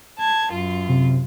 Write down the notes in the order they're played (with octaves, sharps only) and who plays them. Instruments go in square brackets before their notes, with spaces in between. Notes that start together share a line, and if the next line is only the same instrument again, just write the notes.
[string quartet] A5 G#6
F#2 F4
[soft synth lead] C3